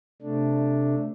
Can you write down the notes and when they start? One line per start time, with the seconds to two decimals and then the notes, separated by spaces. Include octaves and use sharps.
0.22 C3 A3 D4